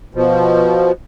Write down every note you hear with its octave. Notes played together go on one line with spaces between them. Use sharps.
B2 F3